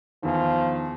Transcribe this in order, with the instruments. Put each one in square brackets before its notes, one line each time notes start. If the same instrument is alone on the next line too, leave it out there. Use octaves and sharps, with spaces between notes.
[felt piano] E2 D#3 [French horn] F3